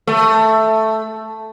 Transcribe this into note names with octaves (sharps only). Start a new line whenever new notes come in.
A3